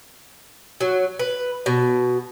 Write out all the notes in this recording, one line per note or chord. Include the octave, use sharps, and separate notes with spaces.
F#3
B4
B2